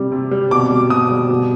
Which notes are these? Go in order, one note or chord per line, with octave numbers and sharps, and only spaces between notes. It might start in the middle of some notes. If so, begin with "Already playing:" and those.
Already playing: C3 G3
C3
G3
B2 D6
G3
B2 D#6
G3
B2